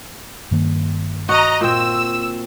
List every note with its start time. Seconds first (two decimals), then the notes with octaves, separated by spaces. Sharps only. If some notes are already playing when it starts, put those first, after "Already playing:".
0.51 G2 D#3 A#3
1.29 F#4 D#5 A#5
1.61 A#2 C4 E6